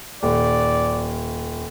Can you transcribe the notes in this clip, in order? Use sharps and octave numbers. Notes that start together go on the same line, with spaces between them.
D#1 D5